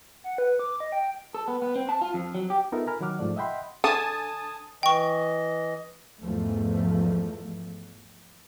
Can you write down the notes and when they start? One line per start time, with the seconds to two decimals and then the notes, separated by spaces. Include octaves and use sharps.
0.24 F#5
0.38 B4
0.59 D6
0.80 D#5
0.92 G5
1.34 A4
1.48 B3
1.62 B3
1.76 C4
1.89 A5
2.01 F4
2.14 F2
2.35 F#3
2.50 G4
2.72 B3 D#4 F4 A4 A#4 E5
2.87 A#4 G#5 A#5 B5 F6
3.01 D#3 F#3 F#5 D6 F6
3.19 G#2 F3 A3 D5
3.36 D#5 E5 F#5 G5 B5 C6
3.84 D3 G#5 A5 D#6
4.83 E3 D#5 G5 C#6
6.22 E2 G#2 F3 A3